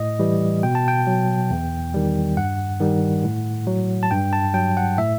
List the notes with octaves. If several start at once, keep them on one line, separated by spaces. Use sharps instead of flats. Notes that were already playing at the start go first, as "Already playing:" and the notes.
Already playing: A2 D#5
E3 G3
B2 G5
A5
G5
F#3
E2
D#3 G3
G2 F#5
D#3 G3
A2
F#3
A5
G2 G5
A5
F#3 G5
F#5
A2 E5